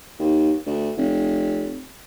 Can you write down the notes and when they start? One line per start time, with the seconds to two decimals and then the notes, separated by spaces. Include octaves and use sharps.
0.19 D#2
0.66 D2
0.97 F1